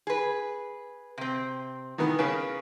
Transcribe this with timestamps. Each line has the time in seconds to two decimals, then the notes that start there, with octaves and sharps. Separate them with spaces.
0.07 G#4 B4
1.18 C3 C4
1.98 D#3 E3 B3
2.19 C#3 A#4 B4